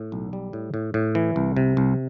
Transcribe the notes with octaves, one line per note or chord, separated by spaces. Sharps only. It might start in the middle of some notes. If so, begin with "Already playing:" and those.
Already playing: A2
B1
G3
A2
A2
A2
E3
C2
C3
C2